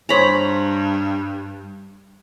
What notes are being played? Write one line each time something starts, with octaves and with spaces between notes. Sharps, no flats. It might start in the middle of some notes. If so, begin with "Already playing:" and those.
G2 C5 C#5 G#5 A#5 B5